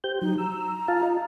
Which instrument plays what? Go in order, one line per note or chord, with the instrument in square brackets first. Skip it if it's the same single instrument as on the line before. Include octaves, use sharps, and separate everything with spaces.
[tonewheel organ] G4 C5 G6
[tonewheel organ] F#3 [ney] D#4
[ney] A#5 [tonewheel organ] E6
[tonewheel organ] F4 F5 A5
F4 D#5